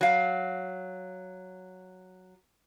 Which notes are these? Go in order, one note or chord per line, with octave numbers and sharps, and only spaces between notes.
F#3 F5